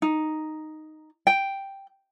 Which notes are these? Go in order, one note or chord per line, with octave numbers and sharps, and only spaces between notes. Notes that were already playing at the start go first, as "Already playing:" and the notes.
D#4
G5